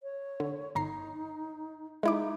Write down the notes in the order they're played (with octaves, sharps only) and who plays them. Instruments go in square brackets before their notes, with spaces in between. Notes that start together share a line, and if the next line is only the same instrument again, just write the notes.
[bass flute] C#5
[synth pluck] D3
[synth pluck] G1 A#5 C7 [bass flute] D#4
[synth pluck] G#3 E4 D6 [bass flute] D#4